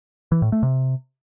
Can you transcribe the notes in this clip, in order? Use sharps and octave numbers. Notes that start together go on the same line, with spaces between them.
E3
A2
A3
C3